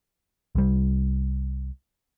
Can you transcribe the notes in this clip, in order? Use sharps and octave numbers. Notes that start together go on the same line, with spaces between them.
C2 G3